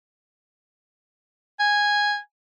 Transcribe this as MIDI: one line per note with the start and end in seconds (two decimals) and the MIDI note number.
1.60 2.17 80